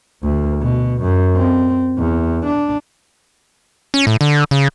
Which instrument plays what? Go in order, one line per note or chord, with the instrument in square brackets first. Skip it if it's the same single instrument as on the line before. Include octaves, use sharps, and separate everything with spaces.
[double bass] D2
B2
F#2
C4
E2
D4
[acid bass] C#4
A2
D3
C#3